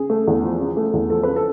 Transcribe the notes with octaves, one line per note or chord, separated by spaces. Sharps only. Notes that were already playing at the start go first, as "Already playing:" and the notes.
Already playing: C#3 G#4
A3
E2
F3
C#3
A3
E2
F3 A4
C#3 B4
A4